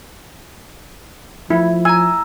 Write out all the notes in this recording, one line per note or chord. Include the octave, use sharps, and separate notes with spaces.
F3 E4
G#5 A#5 E6